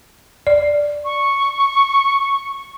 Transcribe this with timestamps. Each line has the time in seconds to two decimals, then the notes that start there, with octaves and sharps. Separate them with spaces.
0.47 D5
1.05 C#6